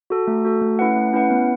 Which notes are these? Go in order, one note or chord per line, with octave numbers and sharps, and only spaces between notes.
F#4 A4
A3
F#4 A4
A3
C#4 E4 B4 F#5
A3
C#4 E4 B4 F#5
B3